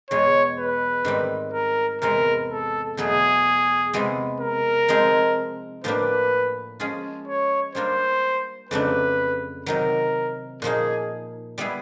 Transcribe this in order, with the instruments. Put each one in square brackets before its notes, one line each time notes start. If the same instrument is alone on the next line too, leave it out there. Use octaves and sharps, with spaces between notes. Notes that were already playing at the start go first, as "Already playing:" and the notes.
[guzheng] E2 B2 G#3 [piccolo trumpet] C#5
[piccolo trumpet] B4
[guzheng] G#2 D#3 G3 C4
[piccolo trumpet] A#4
[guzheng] E2 C3 E3 G#3 [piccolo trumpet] A#4
[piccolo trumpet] A4
[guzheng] E2 B2 F#3 A3 [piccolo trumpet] G#4
[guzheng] C3 E3 G#3 B3
[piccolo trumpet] A#4
[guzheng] F3 G#3 C4 D#4 G#4
[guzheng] A2 F3 A#3 D4 G4 [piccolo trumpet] B4
[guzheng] F3 G#3 C#4 F4 G#4
[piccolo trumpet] C#5
[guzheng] G3 A#3 D4 F4 A#4 [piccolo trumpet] C5
[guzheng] F2 C#3 F#3 A3 D4 [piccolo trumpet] B4
[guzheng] C3 D#3 F#3 [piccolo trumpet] A#4
[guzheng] A#2 F3 A#3 D#4 [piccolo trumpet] G#4
[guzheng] G3 B3 E4 G#4